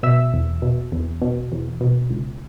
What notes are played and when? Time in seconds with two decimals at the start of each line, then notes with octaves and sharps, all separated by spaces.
0.03 B2 E5 E6
0.33 E2
0.62 B2
0.92 E2
1.22 B2
1.52 E2
1.81 B2
2.10 C#2